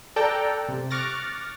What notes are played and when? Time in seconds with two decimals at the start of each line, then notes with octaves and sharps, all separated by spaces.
0.16 A4 D5 G5 A5 A#5 F#6
0.68 C3
0.90 C#6 D6 F6 F#6 A6 A#6